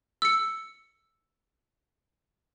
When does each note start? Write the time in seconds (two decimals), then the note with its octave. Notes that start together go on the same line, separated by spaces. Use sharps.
0.22 E6 C#7